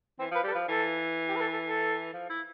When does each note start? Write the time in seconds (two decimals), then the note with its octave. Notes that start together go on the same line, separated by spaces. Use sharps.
0.19 E3 C4
0.31 F3 B4
0.44 G3 A4
0.52 B4
0.55 F3
0.68 E3 A4
1.29 G4
1.36 B4
1.40 A4
1.53 A4
1.65 A4
2.13 F3
2.30 E4